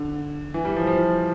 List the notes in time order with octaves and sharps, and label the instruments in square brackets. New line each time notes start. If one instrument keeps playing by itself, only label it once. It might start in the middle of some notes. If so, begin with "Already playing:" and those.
Already playing: [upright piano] D3
E3
G3
F3
F3